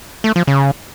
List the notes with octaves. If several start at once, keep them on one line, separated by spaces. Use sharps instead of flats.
A3
F3
C#3